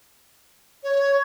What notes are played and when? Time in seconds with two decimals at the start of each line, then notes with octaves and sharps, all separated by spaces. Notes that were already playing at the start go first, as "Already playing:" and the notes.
0.83 C#5